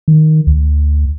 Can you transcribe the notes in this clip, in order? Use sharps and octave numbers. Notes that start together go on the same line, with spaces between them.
D#3
D2